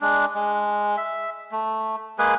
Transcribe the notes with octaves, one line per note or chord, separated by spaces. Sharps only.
G#3 D4
G#3
E5
A3
G#3 A#3 G#4 B4